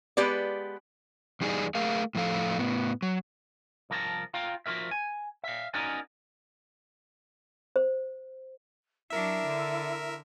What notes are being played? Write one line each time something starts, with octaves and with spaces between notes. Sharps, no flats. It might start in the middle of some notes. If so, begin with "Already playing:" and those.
G#3 B3 G4 B4 D5
E2 G3 D#4 G#4 D5
A3 G#4 A#4 F5
A2 F3 A4 F5
A2 B3
F#3
C2 F3 A#4 D5 A5
F4 F5 G5 A#5
F3 F4 F#4 A#4 E5
G#5
E5 F5
C#4 D#4 F#4 A#4 D5 G#5
C5
F#3 D4 E4 A#4 E5
D3